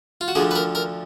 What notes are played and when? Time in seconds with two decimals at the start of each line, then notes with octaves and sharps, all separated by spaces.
0.21 F4
0.28 F#4
0.35 D2 D3 F3 G#4
0.51 B4
0.55 A#4
0.75 A#4